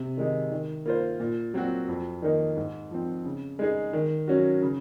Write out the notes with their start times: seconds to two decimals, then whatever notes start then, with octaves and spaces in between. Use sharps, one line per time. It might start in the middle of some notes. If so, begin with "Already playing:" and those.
Already playing: C3
0.17 D#3 G#3 D#4
0.52 D#3
0.86 A#3 F4 C5
1.20 A#2
1.54 F#3 C4 F#4
1.88 F2
2.22 D#3 A#3 D#4
2.56 G#2
2.91 F3 C4
3.25 C#3
3.59 G#3 D#4 G#4
3.93 D#3
4.28 F#3 C#4 F#4
4.62 C#3